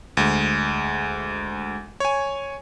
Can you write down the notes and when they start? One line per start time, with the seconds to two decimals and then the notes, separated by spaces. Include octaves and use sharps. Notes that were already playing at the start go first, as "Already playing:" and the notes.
0.17 D2 G#3
2.00 C#5 G#5